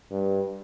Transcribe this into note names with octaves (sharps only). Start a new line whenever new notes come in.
G2